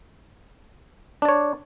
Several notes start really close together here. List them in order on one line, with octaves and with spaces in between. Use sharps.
D4 D5 C#5